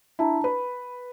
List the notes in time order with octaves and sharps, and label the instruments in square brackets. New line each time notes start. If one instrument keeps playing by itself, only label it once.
[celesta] D4 A5 A#5 [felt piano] E4
[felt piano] B4 [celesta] B5